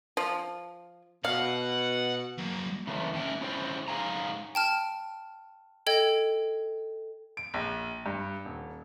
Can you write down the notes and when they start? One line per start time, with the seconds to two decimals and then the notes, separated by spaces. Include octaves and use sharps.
0.17 F3
1.25 B2 F5 F#5
2.38 F#3 A#3
2.87 C#3 E3 A3 A#3 C#4
3.13 G#2 A3 C#4 E5 G5
3.41 C#4 E4 G#4 C5 D5 G5
3.88 G#2 G#4 F5 G#5 A#5
4.55 G5 A5 F6
5.87 A4 D#5 G5 G#6
7.37 D7
7.54 A#1
8.06 G2
8.45 D#1